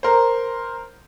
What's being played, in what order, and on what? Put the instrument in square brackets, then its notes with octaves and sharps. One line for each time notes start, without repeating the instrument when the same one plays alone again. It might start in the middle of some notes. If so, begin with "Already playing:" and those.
[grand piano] A#4 C5